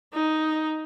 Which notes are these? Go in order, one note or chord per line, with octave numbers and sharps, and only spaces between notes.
D#4